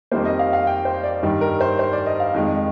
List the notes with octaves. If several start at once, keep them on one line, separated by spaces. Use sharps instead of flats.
F2 D#3 G3 A#3 C5
D#5
F5
F5
G5
C5
D5
G2 D#3 G3
A#4
C5
C5
D5
D#5
F5
F2 D#3 G#3